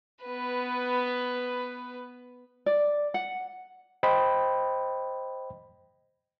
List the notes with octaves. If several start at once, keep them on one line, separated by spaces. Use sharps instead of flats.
B3 B4
D5
F#5
C5 D#5 G5 B5